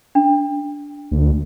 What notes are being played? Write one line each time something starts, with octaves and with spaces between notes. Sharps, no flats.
D4
D2